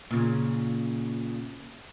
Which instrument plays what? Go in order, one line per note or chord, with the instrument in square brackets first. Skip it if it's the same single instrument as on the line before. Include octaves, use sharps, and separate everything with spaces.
[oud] A#2 C#3